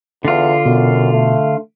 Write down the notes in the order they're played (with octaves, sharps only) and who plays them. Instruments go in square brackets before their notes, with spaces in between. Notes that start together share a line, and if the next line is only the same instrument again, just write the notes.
[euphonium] E2 [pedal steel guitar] D3 F4
[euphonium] F#2 [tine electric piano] B2
[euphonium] A3